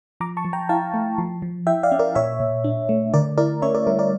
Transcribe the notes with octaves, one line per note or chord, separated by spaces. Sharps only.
F3 A#5 D6
A5 C#6
F3
G5 A#5
E4 F5 A5
A3
F3
F3
E4 E5 G5
D5 F5
C#4
A#4 D5
A#2 C#5 E5
A#2
D4
A3
D3 A#4 D5
E4 A#4 D5
C#4 C#5 E5
A#4 D5
G3 A#4
A#4 D5